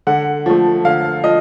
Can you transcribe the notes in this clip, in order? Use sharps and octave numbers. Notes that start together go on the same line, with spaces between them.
D3 F#5
F3 A3
D3 F5
F3 D#5